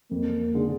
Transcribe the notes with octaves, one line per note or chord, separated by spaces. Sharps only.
F2 A#3
D3 G#3 D4 G#4